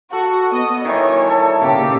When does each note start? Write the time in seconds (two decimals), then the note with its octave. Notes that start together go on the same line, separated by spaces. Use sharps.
0.13 F#4 A4
0.52 B3 D#5
0.85 D#3 E3 G3 C#5
1.27 A4 A5
1.62 A#2 C#3 G4 F5